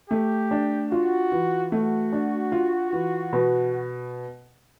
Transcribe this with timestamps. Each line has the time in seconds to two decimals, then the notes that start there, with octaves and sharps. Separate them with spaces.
0.10 A3 G4
0.51 D4
0.91 F4 F#4
1.32 E3
1.72 A3 F#4
2.13 D4
2.52 F4
2.93 E3
3.33 B2